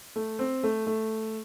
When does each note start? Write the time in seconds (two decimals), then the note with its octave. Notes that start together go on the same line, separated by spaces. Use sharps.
0.16 A3
0.39 C4
0.63 A3
0.87 A3